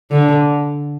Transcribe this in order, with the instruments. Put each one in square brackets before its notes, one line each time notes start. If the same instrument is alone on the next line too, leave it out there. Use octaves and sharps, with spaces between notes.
[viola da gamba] D3